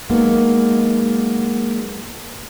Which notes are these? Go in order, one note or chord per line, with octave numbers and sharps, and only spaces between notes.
F#3 G#3 A#3 B3 D#4